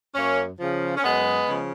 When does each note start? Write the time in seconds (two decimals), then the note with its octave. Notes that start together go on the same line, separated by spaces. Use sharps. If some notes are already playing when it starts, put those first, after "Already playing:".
0.15 F#2 A#3 C#4
0.59 C#3 F3
0.97 C#4
1.03 F#2 G#3 B3
1.48 C#3 F3